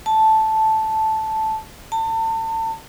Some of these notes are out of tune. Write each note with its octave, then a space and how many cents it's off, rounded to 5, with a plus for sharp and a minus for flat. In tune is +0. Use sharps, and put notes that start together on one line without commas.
A5 -5
A5 +35